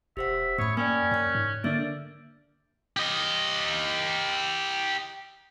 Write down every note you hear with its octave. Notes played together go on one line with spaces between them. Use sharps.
E1 G4 C5 E5 F#5
F#2 A2 C#5 B5 D#6
A#3 C#4 D5 G5 G#5
F#2 C#5 F#6
G#2
D3 A#3 D4 D5 E5 E6 G6
G4 D#5